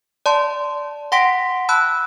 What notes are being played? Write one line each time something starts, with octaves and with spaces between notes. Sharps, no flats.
D5 A5 C6
F#5 G5 C6 A#6 B6 D7
A5 B5 E6 F#6